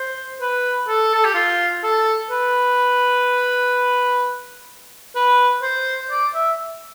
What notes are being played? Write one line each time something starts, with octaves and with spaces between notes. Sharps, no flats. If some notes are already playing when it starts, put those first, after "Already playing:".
Already playing: C5
B4
A4
A4
G4
F4
A4
B4
B4
C5
D5
E5